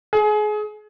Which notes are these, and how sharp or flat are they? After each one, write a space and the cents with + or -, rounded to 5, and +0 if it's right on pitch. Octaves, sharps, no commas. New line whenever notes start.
G#4 +30